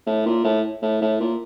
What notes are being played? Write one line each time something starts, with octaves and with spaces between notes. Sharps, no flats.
A2
A#2
A2
A2
A2
A#2